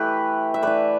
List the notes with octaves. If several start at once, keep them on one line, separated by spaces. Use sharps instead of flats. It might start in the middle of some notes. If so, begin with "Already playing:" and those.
Already playing: E3 A3 E4 G4 B4
E5
E3 A3 E4 B4 D5